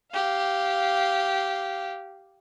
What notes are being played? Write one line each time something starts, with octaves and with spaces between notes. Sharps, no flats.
G4 F5